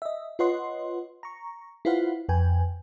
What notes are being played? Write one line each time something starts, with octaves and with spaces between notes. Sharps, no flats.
D#5 E5
F4 B4 C#5 D#5 F#5 C6
A#5 C#6
E4 F4 B4 C5 F5 F#5
F2 B4 G5 G#5